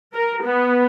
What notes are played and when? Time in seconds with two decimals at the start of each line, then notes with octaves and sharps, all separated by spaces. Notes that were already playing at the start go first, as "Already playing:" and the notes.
0.14 A#4
0.44 B3